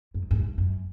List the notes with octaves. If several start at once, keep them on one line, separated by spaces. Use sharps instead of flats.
F#2
F#2
G2
F#2